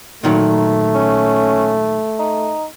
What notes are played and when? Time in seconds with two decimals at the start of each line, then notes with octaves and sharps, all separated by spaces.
0.23 A#2 D#3 F#3 A3
0.95 C#4
2.19 D#4